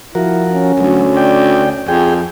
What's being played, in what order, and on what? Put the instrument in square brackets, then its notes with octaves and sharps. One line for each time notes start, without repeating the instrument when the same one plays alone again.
[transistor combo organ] F3 F#4 A#4 [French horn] E4
[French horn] C#4
[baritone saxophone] D2 [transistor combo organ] F#3
[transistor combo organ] D5 G5
[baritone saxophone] F2 [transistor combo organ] G#4 G5